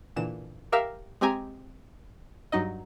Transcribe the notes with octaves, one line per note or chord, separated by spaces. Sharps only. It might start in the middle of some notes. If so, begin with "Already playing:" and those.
A#2 D3 E3 E7
G4 A#4 E5 F5
G#3 C4 G4 G#5 A#5
G2 F#3 D#4 D#5